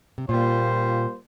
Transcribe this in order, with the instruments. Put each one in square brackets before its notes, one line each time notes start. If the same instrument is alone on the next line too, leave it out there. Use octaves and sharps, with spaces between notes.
[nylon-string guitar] C3
[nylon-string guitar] A#2 [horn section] G3 A#3 F4 C5